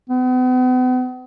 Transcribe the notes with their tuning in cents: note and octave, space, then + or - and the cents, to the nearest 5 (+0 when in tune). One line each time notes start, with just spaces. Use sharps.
B3 +40